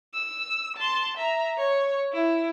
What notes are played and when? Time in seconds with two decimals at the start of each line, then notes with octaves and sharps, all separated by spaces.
0.14 E6
0.77 A5 C6
1.17 E5 A#5
1.57 C#5
2.12 E4